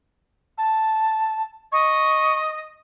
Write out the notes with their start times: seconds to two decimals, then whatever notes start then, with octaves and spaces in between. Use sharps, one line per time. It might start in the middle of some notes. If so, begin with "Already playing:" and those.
0.58 A5
1.72 D#5 C#6